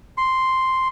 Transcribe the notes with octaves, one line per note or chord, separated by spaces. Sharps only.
C6